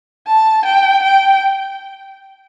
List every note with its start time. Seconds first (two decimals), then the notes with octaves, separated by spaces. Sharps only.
0.27 A5
0.65 G5
1.03 G5